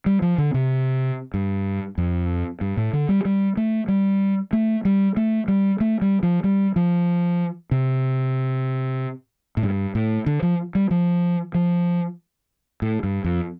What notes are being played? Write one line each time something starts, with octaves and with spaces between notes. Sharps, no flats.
G3
F3
D3
C3
G2
F2
G2
A2
D3
G3
G3
A3
G3
A3
G3
A3
G3
A3
G3
F3
G3
F3
C3
A2
G2
A2
D3
F3
G3
F3
F3
A2
G2
F2